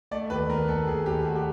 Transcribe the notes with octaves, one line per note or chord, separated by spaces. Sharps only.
A3 D5
D#2 B4
D#2 A#4
D#2 A4
D#2 G#4
D#2 G4
A3 F#4
G4